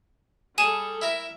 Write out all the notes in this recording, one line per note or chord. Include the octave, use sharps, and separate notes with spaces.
G3 G#4 A4 G#5 D#7 E7
E4 A#4 E5